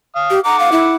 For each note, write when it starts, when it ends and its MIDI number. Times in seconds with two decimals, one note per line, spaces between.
0.16 0.37 77
0.16 0.37 87
0.31 0.40 67
0.45 0.96 78
0.45 0.59 82
0.45 0.96 86
0.59 0.69 77
0.72 0.96 64